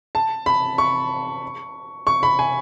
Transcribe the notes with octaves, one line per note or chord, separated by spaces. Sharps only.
A5
B5
C#6
C#6
B5
G#5